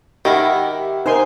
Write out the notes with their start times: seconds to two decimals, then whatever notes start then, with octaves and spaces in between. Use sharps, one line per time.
0.25 D#3 E4 G4 A#4 E5 F#5
1.06 D#4 A#4 C5 G#5 C6